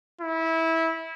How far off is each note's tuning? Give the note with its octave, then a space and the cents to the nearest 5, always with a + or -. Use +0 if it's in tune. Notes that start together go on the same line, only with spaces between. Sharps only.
E4 -20